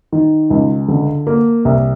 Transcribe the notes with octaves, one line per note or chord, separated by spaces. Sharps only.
D#3
C#2
D3
A#3
C2